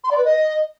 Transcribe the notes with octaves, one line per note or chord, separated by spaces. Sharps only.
C6
D5
B4
D#5